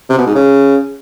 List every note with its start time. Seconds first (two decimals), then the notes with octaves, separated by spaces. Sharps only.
0.10 C3
0.18 B2
0.26 G#2
0.35 C#3